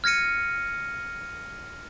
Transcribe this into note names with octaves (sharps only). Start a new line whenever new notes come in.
F6 G#6 A#6 C#7 D#7